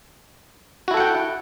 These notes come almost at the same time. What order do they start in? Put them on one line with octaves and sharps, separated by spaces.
F#4 E4 A4 F#5 G5